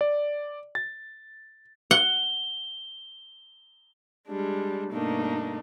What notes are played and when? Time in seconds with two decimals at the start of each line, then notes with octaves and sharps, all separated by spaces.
0.01 D5
0.75 A6
1.91 F#5 G7
4.27 G3 G#3 D4
4.91 G2 B2 A3 A#3 D4 D#4